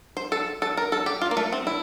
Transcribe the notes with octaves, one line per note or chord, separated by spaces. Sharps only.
C5
A4
A4
A#4
A4
G4
F4
A#3
A3
C4
E4